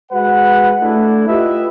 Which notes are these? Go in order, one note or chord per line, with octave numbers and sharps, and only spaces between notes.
G#3 F#4 B4 F#5
A3 D4 E4
F4 G4 B4 D#5 E5